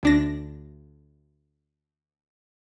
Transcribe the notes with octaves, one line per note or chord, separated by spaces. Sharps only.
D2 D4 A#6